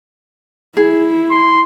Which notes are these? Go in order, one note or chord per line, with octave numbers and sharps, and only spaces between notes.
E4 G#4
C6